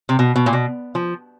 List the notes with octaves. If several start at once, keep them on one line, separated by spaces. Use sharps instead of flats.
C3
B2
B2
A#2
B2
F3